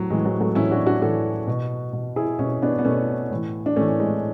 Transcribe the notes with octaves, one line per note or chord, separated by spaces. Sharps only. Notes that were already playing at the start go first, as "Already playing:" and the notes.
Already playing: A2 F#3
A2 E3 G#3
F#3
F#3 A3
A2 E3 C#4 E4
D4 F#4
D4 F#4
A2 E3 F#4 A4
B2
B2
E4 G#4
B2 C#4 E4
B3 D4
B3
B2 A3 C#4
A2 E3
D4
A2 E3 A3 C#4
G#3